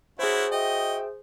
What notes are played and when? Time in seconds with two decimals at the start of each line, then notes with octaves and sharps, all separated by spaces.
0.19 C#4 E4 F#4 G#4 C5
0.51 F#4 D#5 E5 G5